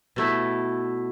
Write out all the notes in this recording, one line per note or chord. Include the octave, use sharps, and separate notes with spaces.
B2 A3 E4